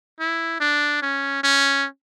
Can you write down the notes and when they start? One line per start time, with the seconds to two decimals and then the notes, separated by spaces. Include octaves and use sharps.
0.20 E4
0.60 D4
1.02 C#4
1.43 C#4